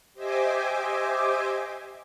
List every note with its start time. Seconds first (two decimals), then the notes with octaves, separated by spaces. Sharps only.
0.13 G4 C5 D#5 E5 G#5 D6